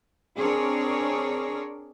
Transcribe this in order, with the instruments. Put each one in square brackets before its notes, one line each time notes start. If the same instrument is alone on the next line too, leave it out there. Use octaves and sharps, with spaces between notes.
[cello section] C4 D4 G#4 A#4 C#5